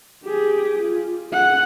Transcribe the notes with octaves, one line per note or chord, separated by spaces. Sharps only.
G4 G#4
F4
G#4 F#5